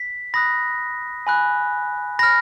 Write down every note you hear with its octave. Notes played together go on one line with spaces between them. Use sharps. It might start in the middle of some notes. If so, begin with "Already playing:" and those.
Already playing: B6
B5 D#6 F#6 A#6
G#5 B5 F#6
B5 F6 A#6